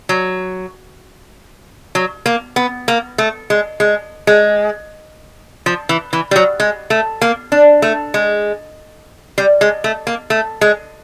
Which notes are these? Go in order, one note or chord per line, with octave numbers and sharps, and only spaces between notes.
F#3
F#3
A#3
B3
A#3
A3
G#3
G#3
G#3
F3
E3
E3
G3
F#3
G#3
A3
A#3
D4
A3
G#3
G3
G#3
A3
A#3
A3
G#3